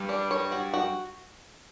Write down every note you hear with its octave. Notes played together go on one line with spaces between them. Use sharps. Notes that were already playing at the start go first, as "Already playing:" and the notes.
Already playing: G2 G3
D4
C#5
F#4
F#4